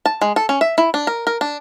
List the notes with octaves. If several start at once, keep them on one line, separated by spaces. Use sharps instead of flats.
A5
G#3
A4
C#4
E5
E4
D4
A#4
A#4
D4